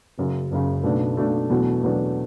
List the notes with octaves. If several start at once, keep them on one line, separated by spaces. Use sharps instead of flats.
F#1 F#2 C#3
F#1 F#2 C#3
B1 B2 A3 D4
B1 B2 A3 D4
E2 B2 F#3 A3 D4
E2 B2 F#3 A3 D4